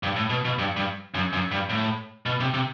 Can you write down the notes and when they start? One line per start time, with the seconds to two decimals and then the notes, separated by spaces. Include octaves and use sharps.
0.03 G2
0.16 A2
0.30 B2
0.45 B2
0.59 G2
0.76 G2
1.14 F#2
1.33 F#2
1.51 G2
1.69 A2
2.26 B2
2.40 C3
2.54 C3